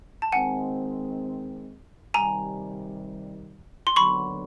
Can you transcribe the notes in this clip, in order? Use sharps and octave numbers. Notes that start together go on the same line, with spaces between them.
A5
D#3 G#3 C4 F#5 G#5
C3 D#3 G3 G#5 A#5
C6
D#2 D3 F#3 B3 B5 C#6